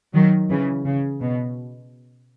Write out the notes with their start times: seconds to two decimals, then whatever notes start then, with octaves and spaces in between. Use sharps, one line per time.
0.13 D#3 F#3
0.49 C#3 E3
0.85 C#3
1.21 B2